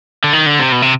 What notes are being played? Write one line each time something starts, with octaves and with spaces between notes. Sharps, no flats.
D3
D#3
D3
C3
B2
C3